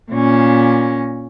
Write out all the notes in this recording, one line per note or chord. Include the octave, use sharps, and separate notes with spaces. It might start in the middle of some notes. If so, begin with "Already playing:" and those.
A#2 C#4